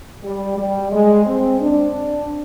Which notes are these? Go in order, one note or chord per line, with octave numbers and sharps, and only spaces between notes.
G3
G3
G#3
C4
D4